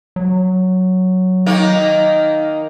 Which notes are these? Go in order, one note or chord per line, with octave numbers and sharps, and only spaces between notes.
F#3
D#3 A#3